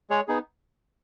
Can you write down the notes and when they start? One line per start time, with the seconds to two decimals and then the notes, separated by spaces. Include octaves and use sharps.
0.10 G#3 G#4 C#5
0.28 B3 D#4 G#4